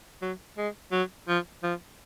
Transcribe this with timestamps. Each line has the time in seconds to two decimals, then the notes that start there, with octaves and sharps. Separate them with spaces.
0.22 F#3
0.57 G#3
0.92 F#3
1.28 F3
1.63 F3